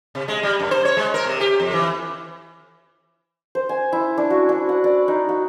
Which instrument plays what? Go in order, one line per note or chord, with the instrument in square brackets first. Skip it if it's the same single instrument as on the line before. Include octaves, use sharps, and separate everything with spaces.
[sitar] C3
G#3
G3
F#2
C5
C#5
G#3
A#4
C3
G4
F2
E3
[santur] C5
G#5
E4
D4
F#4
D4
F#5
D5
D#4
F#4